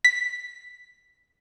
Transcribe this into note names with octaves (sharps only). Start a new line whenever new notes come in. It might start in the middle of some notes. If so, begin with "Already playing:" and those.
B6